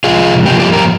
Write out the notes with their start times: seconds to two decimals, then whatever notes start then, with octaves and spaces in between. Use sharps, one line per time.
0.04 C3 F3 G#3 F4 G#4
0.45 G2 F3 A#3 F4 G4
0.60 G4
0.73 G4 A#4